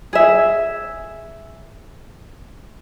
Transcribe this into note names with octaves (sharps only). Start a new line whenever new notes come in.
G#4 E5